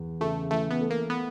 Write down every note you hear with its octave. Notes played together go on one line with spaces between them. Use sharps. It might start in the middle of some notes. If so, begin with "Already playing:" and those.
Already playing: E2
C#3 A3
E3 A3
B3
A3
A#3
B3